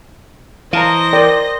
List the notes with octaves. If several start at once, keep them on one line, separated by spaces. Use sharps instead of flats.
E3 C5 D#5 F5 A5 A#5
A#4 D5 G5